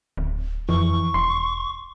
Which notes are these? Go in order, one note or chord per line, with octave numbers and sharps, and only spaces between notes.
D1
F2 E3 C#6
E1 C6